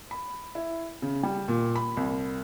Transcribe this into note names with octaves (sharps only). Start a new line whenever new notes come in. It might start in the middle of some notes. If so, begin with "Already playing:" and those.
B5
E4
C#3
G3
A#2
B5
C2